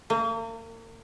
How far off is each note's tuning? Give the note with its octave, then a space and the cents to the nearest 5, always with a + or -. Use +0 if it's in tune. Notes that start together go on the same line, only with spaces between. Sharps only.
A#3 -40